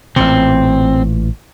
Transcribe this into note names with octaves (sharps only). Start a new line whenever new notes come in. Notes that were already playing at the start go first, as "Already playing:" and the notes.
A1 A#2 C4